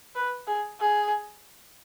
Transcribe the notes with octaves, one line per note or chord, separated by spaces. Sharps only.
B4
G#4
G#4